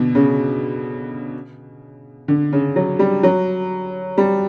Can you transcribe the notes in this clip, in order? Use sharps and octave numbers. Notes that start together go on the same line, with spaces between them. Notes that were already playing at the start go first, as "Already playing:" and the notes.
Already playing: B2 D3
C#3
D3
C#3
F#3
G3
F#3
G3